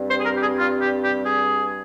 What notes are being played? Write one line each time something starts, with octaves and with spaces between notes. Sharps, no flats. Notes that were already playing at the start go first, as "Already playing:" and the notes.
Already playing: G2 G3 C4
C5
G#4
A#4
G4
G#4
F4
G4
G4
G#4